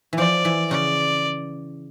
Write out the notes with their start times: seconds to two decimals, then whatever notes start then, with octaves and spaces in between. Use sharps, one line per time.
0.13 E3
0.18 F3 D5
0.45 E3
0.71 C#3 D5